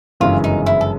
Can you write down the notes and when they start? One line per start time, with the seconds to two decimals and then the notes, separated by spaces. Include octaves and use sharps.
0.20 G1 F#2 C#3 E3 G#3 F4
0.44 D#4
0.66 E4
0.81 A4